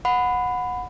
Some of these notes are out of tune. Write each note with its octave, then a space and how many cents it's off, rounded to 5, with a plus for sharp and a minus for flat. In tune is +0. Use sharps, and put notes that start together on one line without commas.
F#5 -20 B5 +15